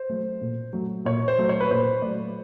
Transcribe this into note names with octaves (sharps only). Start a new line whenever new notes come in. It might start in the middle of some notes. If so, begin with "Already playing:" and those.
Already playing: C5
F#3 A3
A#2
F#3 A3
A#2 C#5
C5
F#3 A3
C#5
B4
A#2 C5
F#3 A3 D5